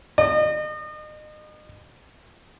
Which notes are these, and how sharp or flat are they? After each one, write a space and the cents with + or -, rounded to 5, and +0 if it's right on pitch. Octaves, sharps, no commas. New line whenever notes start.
D#5 -35